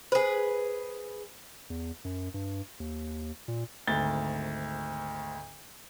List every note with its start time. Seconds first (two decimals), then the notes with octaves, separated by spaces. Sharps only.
0.12 G#4 B4 C5
1.70 E2
2.05 F#2
2.34 G2
2.80 D#2
3.48 A#2
3.87 G#1 D2 A6 G7